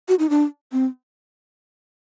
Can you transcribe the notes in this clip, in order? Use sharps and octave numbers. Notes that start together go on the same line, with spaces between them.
F#4
D#4
D4
C4